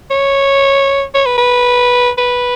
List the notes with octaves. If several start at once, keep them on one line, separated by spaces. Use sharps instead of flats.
C#5
C#5
B4
B4
B4